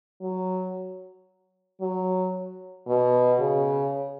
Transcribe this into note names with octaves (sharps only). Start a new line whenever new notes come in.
F#3
F#3
B2
C#3